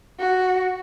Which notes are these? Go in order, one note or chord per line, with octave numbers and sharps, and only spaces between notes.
F#4